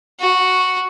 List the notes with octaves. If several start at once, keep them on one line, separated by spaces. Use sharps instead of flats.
F#4